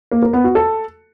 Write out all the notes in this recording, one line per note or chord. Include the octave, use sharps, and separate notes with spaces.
A#3
A#4
B3
F#4
A4